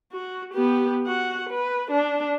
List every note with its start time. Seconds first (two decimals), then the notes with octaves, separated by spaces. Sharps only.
0.12 F#4
0.53 B3 G4
1.06 F#4 F#5
1.49 B4
1.91 D4